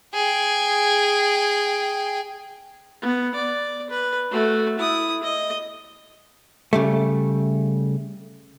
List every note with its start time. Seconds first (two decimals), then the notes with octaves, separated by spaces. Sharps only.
0.14 G#4 G5
3.02 B3
3.35 D5
3.91 B4
4.31 A3 F#4
4.79 E4 D#6
5.23 D#5
6.73 C#3 G3 A3